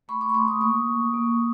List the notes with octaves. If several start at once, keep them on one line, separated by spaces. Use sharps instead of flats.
A3 B5 C#6
C6 D6
C#6
A3 C6 D6
C#6 D#6
A#3 C#6 D#6
A#3
A#3